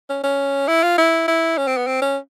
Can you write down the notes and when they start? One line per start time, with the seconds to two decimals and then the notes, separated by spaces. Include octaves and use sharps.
0.09 C#4
0.24 C#4
0.68 E4
0.83 F4
0.98 E4
1.28 E4
1.58 C#4
1.67 C4
1.77 B3
1.87 C4
2.02 C#4